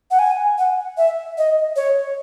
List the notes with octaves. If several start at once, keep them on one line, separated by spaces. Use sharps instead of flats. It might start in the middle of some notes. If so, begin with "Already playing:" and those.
F#5
G#5
F#5
E5
D#5
C#5